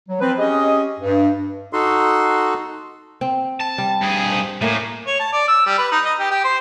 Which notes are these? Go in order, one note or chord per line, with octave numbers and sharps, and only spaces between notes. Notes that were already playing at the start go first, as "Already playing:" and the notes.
F#3
F3 C4 B4
C#4 G4 G#4 D#5
G2
D#4 F#4 A4 C6
C4
A5
G3
G2 G#4
C5
A2 A3 A#3 C#4
C#5
A5
D5
E6
G3
B4
D#4
D#5
G4
G4
C5